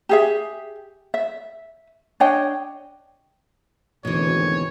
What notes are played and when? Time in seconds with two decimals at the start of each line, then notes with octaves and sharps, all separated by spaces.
0.09 G4 G#4 E5
1.14 E5
2.20 D4 C#5 D#5 G5
4.05 G#1 D2 B2 E3 C#5